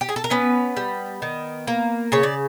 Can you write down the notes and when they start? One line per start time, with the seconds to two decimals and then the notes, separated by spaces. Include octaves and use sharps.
0.01 G4
0.09 G#4
0.16 A4
0.24 A#4
0.30 B3 C#4 B4
0.77 G3
1.22 D#3
1.68 A#3
2.12 C#3 C#5
2.23 D5